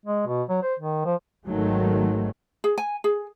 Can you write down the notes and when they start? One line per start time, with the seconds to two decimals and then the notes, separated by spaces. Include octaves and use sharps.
0.06 G#3
0.27 B2
0.49 F#3
0.62 C5
0.79 D#3
1.05 F3
1.46 G#1 G#2 D#3 F#3 G#3 A3
2.64 G#4
2.78 G#5
3.04 G#4